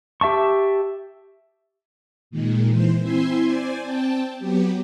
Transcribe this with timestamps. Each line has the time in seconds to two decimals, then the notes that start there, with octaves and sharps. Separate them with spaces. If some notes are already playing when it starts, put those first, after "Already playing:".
0.21 G4 E5 A5 C#6
2.31 A#2 D#3 G#3
2.68 E3 C5
3.00 C4 E4 E5 G#5 C6
3.43 C5 D5 G#5
3.83 C4 G5 A5
4.39 F#3 B3 G4